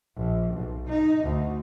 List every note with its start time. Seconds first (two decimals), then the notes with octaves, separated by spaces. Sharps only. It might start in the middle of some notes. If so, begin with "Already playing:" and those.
0.17 A#1
0.54 B1
0.88 D#4
1.24 D2